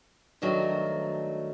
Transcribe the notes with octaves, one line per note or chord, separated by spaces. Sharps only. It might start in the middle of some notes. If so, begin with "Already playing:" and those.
G2 D#3 F#3 A3